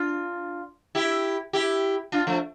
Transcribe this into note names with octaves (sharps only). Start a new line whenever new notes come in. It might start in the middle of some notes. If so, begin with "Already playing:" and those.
Already playing: D4 F4
E4 G4
E4 G4
D4 F4
F3 A3